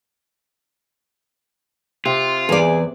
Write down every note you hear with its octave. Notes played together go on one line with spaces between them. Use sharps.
C3 F4
E2 G#4 D5